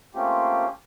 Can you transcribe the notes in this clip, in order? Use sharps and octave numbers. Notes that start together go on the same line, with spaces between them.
A3 A#3 C4 C#4 F4 G4